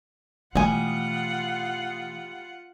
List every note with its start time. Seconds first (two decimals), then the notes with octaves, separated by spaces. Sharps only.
0.55 B2 E3 G3 A3 F4 F#5 G#5 D#6